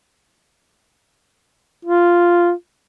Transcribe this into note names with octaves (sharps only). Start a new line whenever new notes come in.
F4